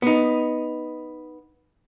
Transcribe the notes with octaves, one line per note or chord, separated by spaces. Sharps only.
B3 D#4